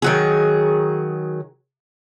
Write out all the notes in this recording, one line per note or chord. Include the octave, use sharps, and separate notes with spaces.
D#3 F#3 G#4